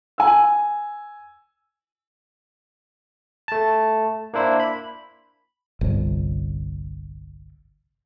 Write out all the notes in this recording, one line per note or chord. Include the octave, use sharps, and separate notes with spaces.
G#5 E6
A3 A5
A#3 D4 E4 C5
B5
G1 C2